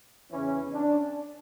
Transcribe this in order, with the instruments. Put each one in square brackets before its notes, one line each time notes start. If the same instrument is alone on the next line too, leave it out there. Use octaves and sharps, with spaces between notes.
[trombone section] E2 C#3 E3 C#4
D4